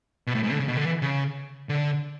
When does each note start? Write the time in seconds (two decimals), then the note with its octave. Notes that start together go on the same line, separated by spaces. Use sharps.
0.27 B2
0.35 A2
0.43 G#2
0.51 D3
0.60 C#3
0.68 B2
0.77 D3
0.85 E3
1.02 C#3
1.69 D3